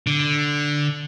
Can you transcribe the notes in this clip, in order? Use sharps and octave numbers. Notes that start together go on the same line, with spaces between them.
D3